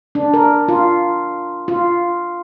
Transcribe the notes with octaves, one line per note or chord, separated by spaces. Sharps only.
D4
A#4
F4
F4